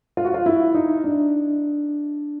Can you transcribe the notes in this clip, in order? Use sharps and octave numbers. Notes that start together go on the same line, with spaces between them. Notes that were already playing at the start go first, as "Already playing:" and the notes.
F4
F#4
F4
E4
D#4
D4